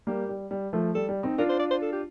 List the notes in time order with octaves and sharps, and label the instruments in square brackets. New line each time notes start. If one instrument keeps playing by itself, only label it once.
[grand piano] G3 A#3 [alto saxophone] G4
[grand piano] G3
G3
F3 A3
[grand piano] G3 [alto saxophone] A4
[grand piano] G3
C4 D#4
[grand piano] D4 F4 [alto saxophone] A#4
[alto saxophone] C5
D5
C5
A4
G4